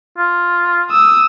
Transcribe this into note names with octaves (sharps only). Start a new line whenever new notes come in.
F4
D#6 E6